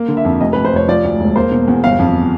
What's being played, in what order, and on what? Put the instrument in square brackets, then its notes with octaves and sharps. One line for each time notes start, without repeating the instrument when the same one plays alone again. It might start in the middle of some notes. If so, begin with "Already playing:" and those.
Already playing: [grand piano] A#3
D3
E5
F2
F1 D#5
B4
F2
C5
F1 C#5
F3 D5
D2
E1
A#3 C5
B2
E2
G1 F5
F2